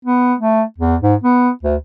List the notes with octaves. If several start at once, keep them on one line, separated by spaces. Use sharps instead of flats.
B3
A3
E2
G#2
B3
D2